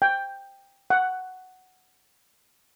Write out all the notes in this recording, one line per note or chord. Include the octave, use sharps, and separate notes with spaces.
G5
F#5